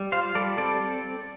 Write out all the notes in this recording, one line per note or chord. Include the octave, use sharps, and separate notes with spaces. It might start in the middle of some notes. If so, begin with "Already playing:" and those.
Already playing: G3
F4 C5 F5
G3 A4 D5
C4 A4 D5